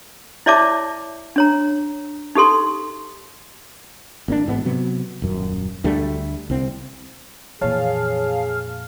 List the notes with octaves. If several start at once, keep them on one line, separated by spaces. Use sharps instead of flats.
E4 C#5 D5 E5 A5 D6
D4 C#5 A#5
D#4 G4 A4 C6
G#1 A#3 C#4 D4
A1 G#2 B3
C3 F#3 B3
D#1 F#2
D2 D3 G3 A3
C2 C4
F2 A#2 E3 G#4 C#5 F5 A5